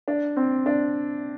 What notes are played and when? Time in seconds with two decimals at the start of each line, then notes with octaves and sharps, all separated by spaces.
0.08 D4
0.36 C4
0.66 D4